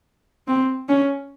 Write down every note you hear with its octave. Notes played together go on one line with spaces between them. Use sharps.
C4
C#4